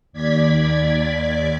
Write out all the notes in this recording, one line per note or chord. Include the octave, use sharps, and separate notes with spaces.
D#2 D5 G#6 B6